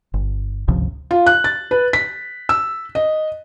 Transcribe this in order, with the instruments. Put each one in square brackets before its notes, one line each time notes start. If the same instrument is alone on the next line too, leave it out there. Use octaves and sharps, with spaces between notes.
[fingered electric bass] G1
G1 C#2 C3 F3
[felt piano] F4
F#6
A6
B4
B6
E6
D#5